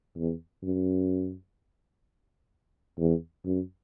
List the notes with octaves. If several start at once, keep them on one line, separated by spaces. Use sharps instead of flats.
E2
F#2
E2
F#2